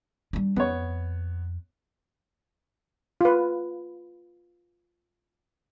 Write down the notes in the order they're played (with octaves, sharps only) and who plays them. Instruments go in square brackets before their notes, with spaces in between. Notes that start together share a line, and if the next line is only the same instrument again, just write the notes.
[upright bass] G3 D4
[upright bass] F2 [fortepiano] B3 C#5
[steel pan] F4 B4